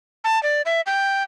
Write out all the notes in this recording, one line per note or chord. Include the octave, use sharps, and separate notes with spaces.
A5
D5
E5
G5